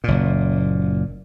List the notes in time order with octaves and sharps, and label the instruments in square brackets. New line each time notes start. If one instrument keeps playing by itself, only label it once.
[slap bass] F#1 A#2